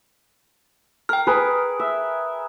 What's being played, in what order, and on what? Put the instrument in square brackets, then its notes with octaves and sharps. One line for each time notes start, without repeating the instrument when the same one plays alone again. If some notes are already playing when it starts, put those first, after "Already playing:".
[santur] A#4 [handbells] G5 F6
[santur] G#4 A#4 B4
E5